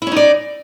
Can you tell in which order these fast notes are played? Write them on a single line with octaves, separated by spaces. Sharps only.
E4 C#4 D#4 D5